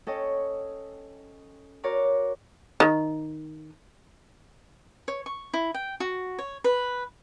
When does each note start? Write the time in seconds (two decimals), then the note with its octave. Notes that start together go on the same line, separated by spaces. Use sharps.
0.07 C#4 A4 C#5 D#5 G5
1.84 F#4 A#4 C#5 D5 A#5 D6
2.80 D#3
5.08 C#5
5.26 C#6
5.54 E4
5.74 G5
6.00 F#4
6.39 C#5
6.64 B4